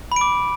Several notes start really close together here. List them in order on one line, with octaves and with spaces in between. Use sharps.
B5 D7 D6